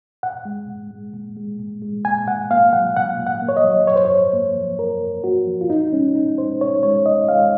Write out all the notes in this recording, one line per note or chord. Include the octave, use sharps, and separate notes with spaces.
A#2 F#5
G#3
A#2
G#3
A#2
G#3
A#2
G#3
A#2 G#5
A#2 F#5
A#3 F5
F#3 F#5
A#2 F#5
A#2
F#5
A#3
C#5
D#5
F#3
F#2 C#5
C5
F#2 C#5
A#3
F3
F#2 A#4
F#2
A#3 F#4
F3
F4
A#2 D#4
D#4
G#3 C#4
A#2 D#4
G#3 C5
A#2 C#5
G#3 C#5
A#2 D#5
G#3 F5